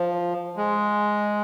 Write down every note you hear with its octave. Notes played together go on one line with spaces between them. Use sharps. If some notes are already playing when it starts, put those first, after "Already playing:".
Already playing: F3
G#3